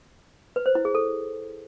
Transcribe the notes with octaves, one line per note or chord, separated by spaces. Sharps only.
B4
C5
E4
G#4
A4